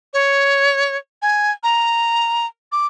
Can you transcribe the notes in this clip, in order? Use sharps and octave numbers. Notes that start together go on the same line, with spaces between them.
C#5
G#5
A#5
D6